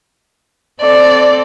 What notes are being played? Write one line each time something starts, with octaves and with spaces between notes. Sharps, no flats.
C4 A4 D5